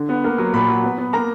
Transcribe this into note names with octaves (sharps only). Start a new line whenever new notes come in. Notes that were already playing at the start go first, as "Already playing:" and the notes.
Already playing: D3
B3
A#3
F#3
A#2 B5
F#3
B3
B3
A#3 A#5